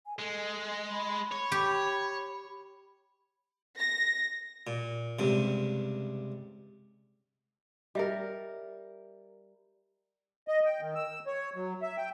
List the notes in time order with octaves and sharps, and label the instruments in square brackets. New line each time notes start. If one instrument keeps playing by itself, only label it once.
[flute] G#5
[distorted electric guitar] G#3 [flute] A4
[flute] B5
[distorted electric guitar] C#5
[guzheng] G4
[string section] A#6
[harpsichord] A#2
C#2 G2 C3
[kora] G3 A#4 [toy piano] D#5 E5
[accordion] D#5
G5
D#3
E6
C#5
F#3
E5
G5